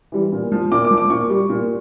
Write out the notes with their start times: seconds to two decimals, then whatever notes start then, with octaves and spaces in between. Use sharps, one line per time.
0.12 E3 G3
0.32 A#2
0.52 F3
0.72 A#2 D6
0.84 D6
0.91 F3
0.97 D6
1.10 A#2 C#6
1.30 G3
1.49 A#2